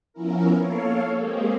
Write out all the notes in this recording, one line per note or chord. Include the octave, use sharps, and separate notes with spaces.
F3 B3 C#4 E4 A#4
A#3 A4 C#5 F5
G#3 A#3 C4 G4 G#4